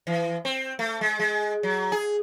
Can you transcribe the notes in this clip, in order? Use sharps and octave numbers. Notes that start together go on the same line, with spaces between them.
E3
C4
A3
G#3
G#3
F#3
G#4